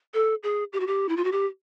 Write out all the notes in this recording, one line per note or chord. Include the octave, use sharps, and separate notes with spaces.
A4
G#4
G4
F#4
G4
E4
F4
F#4
G4